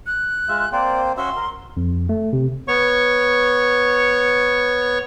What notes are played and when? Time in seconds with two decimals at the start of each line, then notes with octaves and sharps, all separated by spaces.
0.06 F#6
0.48 G#3 F4 E5
0.72 A#3 C4 C5 D5
1.17 C#4 F#4 E5 C6
1.36 A#4
1.77 F2
2.09 A3
2.33 C3
2.68 B3 C#5 C#6